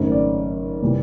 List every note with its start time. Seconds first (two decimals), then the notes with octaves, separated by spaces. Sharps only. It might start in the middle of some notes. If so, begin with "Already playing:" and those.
Already playing: G#1 F#2 C#3 F#3 A3 C5
0.12 D5
0.82 C3 E3 G3